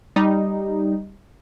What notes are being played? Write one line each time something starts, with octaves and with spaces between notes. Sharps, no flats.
G3 D#4